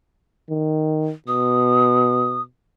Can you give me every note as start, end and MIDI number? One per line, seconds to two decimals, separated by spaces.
0.50 1.11 51
1.28 2.46 47
1.28 2.42 87